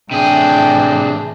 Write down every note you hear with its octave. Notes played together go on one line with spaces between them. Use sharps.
A2 C3 E3 D4 G#4 G5